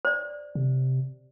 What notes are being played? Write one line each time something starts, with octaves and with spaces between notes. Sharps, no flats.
C5 D5
C3